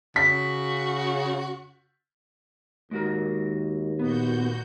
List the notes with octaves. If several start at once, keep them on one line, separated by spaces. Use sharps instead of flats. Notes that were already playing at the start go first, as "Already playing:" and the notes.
C#3 F#4 B6
D#2 G#3 F#4 A#4
A#2 B3 F#4 G6